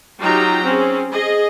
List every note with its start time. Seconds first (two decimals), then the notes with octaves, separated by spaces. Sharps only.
0.20 F#3 D#4 F4 G4 G5 A#5
0.63 C4 C#4 G#4
1.11 G#4 D#5